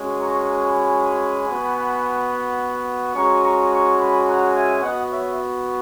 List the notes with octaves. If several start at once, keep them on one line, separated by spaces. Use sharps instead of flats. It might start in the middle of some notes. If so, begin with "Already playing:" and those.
Already playing: G#3 C#4 F#4
A#5 C#6
G#5 B5
B3 F#4
G#3 C#4 F#4 A#5 C#6
A#5 C#6
A#5 C#6
G#5 B5
F#5 A#5
E5 G#5
B3 F#4 D#5 F#5
C#5 E5